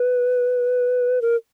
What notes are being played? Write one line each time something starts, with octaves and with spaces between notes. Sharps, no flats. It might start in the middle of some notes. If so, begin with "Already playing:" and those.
Already playing: B4
A#4